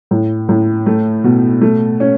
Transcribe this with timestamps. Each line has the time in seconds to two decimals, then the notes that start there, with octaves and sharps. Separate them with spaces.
0.11 A2
0.49 A2
0.86 A3
1.24 B2
1.62 A3
2.00 C#4